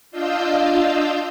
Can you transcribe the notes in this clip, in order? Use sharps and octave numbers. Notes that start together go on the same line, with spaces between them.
D4 F4 D#5 F5 E6 G6